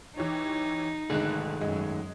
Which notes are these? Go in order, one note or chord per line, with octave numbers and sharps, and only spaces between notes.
E3 D#4 G4 C#5
D3 D#3 G#3 A3 G#4 F#6
F#2 G#3